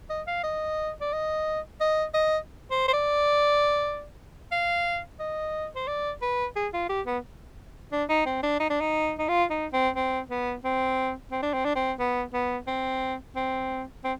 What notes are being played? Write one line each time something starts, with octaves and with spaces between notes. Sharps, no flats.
D#5
F5
D#5
D5
D#5
D#5
D#5
C5
C5
D5
F5
D#5
C5
D5
B4
G#4
F4
G4
B3
D4
D#4
C4
D4
D#4
D4
D#4
D#4
F4
D#4
C4
C4
B3
C4
C4
D4
C4
D4
C4
B3
B3
C4
C4
C4